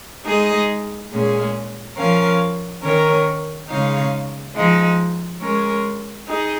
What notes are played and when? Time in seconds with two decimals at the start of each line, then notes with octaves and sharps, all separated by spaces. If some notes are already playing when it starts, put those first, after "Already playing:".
0.25 G#3 D#4 G#4 D#5
1.11 A#2 G#3 C#4 G#4
1.97 F3 C#4 A#4 F5
2.83 D#3 C#4 A#4 C#5
3.69 C#3 G#3 D#4 C#5 F5
4.55 F3 G#3 D#4
5.41 G#3 C#4 A#4 C#5
6.27 D#4 G#4 D#5